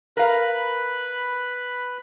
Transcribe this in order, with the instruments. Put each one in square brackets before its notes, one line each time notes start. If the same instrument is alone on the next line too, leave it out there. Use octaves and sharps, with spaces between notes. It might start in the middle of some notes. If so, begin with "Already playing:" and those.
[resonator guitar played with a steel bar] A#4 F5 [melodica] B4 B5